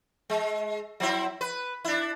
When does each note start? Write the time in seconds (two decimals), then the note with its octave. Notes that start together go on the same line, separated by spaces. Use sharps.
0.30 G#3
1.00 F#3 C4 E4
1.41 B4
1.85 D4 E4